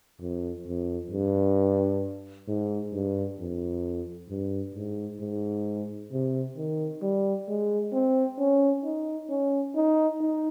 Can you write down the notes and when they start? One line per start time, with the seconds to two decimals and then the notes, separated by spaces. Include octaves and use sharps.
0.21 F2
0.66 F2
1.11 G2
2.48 G#2
2.93 G2
3.39 F2
4.30 G2
4.74 G#2
5.21 G#2
6.12 C3
6.57 D#3
7.02 G3
7.48 G#3
7.93 C4
8.39 C#4
8.84 D#4
9.29 C#4
9.76 D#4
10.20 D#4